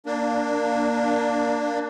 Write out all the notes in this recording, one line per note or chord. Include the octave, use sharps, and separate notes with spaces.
A#3 D4